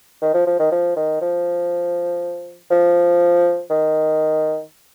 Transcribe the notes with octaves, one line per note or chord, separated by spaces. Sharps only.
D#3
F3
F3
D#3
F3
D#3
F3
F3
D#3